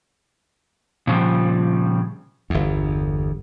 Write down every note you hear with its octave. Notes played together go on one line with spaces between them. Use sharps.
A#2 C#3 F3 G3
G1 E2